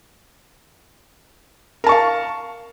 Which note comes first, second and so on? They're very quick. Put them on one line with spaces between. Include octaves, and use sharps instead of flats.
A#4 A5 C#6 F5